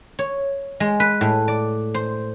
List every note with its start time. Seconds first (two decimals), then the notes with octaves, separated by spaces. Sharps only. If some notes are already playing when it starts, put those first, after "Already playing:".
0.19 C#5
0.80 G#3
1.00 B4
1.21 A2
1.48 D5
1.94 C5